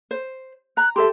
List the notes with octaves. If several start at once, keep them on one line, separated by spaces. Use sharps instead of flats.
C5
A#5 F#6
G4 A4 E5 C6